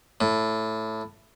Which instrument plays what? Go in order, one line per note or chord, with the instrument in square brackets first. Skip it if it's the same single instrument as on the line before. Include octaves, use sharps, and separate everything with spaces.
[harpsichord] A2